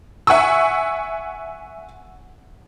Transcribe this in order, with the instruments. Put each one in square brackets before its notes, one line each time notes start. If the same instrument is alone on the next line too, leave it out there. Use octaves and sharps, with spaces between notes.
[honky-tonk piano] E5 F#5 G#5 C#6 E6